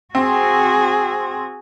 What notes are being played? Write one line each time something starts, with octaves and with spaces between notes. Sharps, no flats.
C4 F#4 G#4